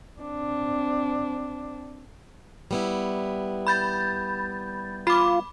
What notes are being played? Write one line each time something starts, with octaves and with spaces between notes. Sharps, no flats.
C4 D4
G3 B3 E4
B5 G6 A6
F4 B5 D6